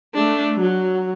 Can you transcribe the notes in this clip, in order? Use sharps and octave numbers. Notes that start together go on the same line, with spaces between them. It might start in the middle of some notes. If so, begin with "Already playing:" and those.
A3 D4
F#3